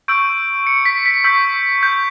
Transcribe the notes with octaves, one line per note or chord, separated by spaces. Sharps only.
C#6 E6 G6 D7
C#7
B6
B6
C#6 E6 G6 B6
G6